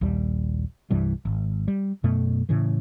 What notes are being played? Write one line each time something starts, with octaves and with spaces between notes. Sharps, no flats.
A#1 D#2 G3
C2 G2 E3 G3
G#1
G3
F#2 B2 A3
A2 C#3 E3